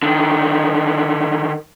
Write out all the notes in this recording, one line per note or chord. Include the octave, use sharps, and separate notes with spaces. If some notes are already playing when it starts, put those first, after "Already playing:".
D3 D#3